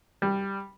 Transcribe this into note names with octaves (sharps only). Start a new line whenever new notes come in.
G3